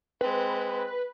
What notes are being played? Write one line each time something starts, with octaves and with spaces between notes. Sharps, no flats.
G#3 C4 B4